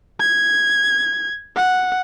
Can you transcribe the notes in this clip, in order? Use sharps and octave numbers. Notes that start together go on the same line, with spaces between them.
G#6
F#5